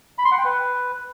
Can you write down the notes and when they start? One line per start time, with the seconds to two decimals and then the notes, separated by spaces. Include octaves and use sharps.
0.18 B5
0.25 C6
0.32 F#5
0.38 G5
0.45 B4